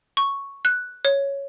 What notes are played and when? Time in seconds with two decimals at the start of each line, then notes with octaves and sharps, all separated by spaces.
0.17 C#6
0.65 F#6
1.05 C#5